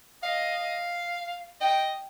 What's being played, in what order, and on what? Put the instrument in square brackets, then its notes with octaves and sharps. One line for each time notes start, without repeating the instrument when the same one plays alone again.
[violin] D#5 [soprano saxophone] F5
[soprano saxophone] D#5 [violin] G5